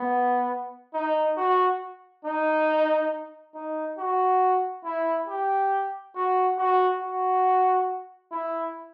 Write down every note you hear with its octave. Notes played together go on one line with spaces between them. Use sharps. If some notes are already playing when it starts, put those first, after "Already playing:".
Already playing: B3
D#4
F#4
D#4
D#4
F#4
E4
G4
F#4
F#4
F#4
E4